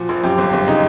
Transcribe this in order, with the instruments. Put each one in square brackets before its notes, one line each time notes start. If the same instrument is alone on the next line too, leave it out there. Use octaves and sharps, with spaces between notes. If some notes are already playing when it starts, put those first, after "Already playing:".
Already playing: [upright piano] A#2 F3 F#4
A#1
F#2 G4
G1
G1
C#3 D#4